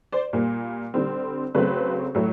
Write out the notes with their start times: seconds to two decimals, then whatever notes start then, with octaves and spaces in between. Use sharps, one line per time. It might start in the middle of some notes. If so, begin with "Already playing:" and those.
0.12 C5 D5
0.33 A#2 G3 A#3
0.94 D3 G3 C4
1.55 C#3 F#3 A3 C4 B4
2.15 A2 F#3 A3